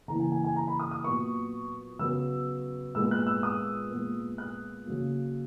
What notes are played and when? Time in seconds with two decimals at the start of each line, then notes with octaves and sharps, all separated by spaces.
0.08 C#3 E3 A#3 A#5
0.20 G#5
0.32 G#5
0.44 G#5
0.56 A#5
0.68 B5
0.80 D#6
0.91 D#6
1.04 A#2 F#3 B3 C#6
1.99 C#3 F#3 B3 E6
2.95 A#2 G#3 B3 E6
3.11 F#6
3.27 E6
3.43 D#6
3.91 A#2 G#3 B3
4.38 F#6
4.86 C#3 F#3 A#3